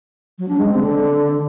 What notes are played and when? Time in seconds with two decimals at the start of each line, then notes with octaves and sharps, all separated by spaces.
0.39 F#3
0.49 D4
0.59 G#3
0.68 C4
0.78 D3